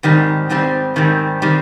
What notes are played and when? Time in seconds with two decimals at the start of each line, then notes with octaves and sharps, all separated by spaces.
0.03 G#2 D#3 G3 C4
0.50 G#2 D#3 G3 C4
0.96 G#2 D#3 G3 C4
1.42 D#3 G3 C4